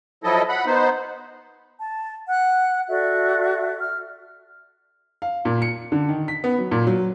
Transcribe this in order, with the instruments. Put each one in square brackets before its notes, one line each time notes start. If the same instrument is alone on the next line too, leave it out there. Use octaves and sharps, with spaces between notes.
[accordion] F3 F#3 E4 A4 D#5
F#5 B5
B3 D#4 C5
[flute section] A5
F#5 F#6
F#4 A4 D5 E5
F6
[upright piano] F5
A#2
C#7
D3
D#3
B6
B3
F#3
A#2
F#3